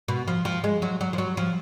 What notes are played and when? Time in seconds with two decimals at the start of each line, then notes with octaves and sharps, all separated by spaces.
0.08 B2
0.28 F3
0.45 F3
0.64 G#3
0.82 F#3
1.01 F#3
1.13 F3
1.18 F#3
1.37 F3